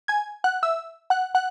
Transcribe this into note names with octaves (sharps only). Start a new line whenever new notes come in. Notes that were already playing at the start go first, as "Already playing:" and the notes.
G#5 G#6
F#5 F#6
E5 E6
F#5 F#6
F#5 F#6